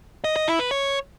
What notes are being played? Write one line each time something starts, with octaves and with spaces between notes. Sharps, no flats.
D#5
D#5
E4
B4
C#5